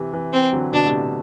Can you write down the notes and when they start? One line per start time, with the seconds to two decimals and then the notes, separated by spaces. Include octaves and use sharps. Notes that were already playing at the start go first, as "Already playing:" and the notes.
Already playing: C3 E3
0.13 C3 E3
0.33 C4
0.53 D3 F#3
0.73 B2 D3 D4
0.86 A2 C3